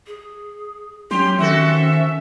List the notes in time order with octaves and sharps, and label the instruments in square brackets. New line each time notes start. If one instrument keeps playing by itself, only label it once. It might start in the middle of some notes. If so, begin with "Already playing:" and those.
[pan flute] G#4
[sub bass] F#3 [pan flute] C#4 [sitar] G4 [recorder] C6
[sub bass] D#3 [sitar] C4 F#4 A4 [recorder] E5